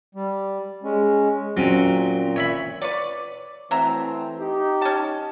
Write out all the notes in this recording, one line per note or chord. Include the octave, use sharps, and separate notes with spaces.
G3
G#3 C#4
A#2 F#3 C4 C#4
C#5 E5 B5
B4 C#5 D5
E3 F#3 A3 C4 E5 A#5
D#4 G4
C#4 A5